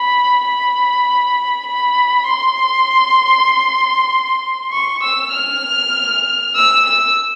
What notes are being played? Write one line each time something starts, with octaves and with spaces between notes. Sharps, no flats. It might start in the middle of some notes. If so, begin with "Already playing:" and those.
Already playing: B5
B5
B5
C6
C#6
E6
F6
E6
E6